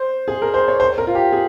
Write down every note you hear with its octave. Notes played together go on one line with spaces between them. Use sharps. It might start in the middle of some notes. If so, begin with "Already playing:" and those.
Already playing: C5
G#4
A#4
C5
C#5
C5
A#4
F4
G4
G#4